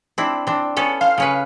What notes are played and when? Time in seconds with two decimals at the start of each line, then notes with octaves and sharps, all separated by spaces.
0.18 C4 D4 E4
0.47 C4 D4
0.76 B3 C#4 A4
1.01 C5 F5
1.18 C#3 C#4 B4